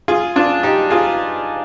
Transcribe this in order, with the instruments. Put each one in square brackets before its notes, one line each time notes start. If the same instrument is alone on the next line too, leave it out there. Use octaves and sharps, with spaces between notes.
[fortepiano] F4 G#4
D4 F4
D#4 G4
F4 G#4